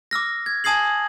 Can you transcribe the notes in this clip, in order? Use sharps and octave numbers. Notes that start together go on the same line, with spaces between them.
D6 E6 F6 A#6
G#6
G#5 A5 D#6 G#6 C7 F#7